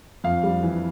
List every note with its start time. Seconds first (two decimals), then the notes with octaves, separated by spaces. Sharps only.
0.24 F2 F5
0.43 G3
0.63 E3